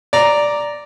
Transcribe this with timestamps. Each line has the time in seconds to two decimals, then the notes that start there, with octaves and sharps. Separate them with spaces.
0.13 D5 A#5